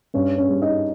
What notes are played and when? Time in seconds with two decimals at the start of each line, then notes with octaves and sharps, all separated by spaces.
0.14 G2 C#4 C#5
0.38 C#4 C#5
0.50 G3
0.62 D#4 D#5